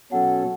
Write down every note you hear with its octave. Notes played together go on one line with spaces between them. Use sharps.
B2 F#3 C#4 A4 F#5